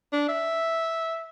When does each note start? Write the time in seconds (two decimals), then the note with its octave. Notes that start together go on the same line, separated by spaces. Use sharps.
0.13 D4
0.29 E5